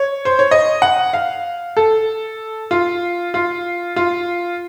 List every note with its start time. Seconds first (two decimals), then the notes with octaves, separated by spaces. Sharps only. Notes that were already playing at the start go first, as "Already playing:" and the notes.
Already playing: C#5
0.25 C5
0.39 C#5
0.51 D#5
0.82 F#5
1.13 F5
1.77 A4
2.71 F4
3.34 F4
3.96 F4